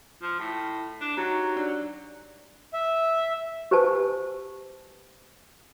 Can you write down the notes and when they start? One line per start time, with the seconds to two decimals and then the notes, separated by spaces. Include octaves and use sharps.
0.22 F3
0.39 A2
1.01 D4
1.17 F#3 D#4 G4 A#5
1.56 D4 D5 F#6
2.73 E5
3.71 G4 B4 C5 G#5 A5